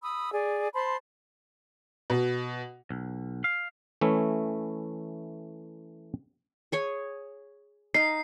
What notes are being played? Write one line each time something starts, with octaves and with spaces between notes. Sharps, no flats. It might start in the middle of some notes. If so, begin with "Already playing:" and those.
B5 D#6 E6
G#4 D5
C5 A5 B5 C6
B2
B1
F5
E3 A3 C#4 E4 E5
G#4 C#5 G#5
D#4 F5 C7